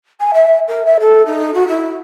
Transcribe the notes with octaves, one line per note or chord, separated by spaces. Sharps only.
G#5
E5
A#4
E5
A4
D#4
F#4
E4